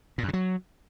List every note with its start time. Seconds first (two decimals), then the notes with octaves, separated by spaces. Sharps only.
0.18 A#2
0.23 F#2
0.28 C3
0.33 F#3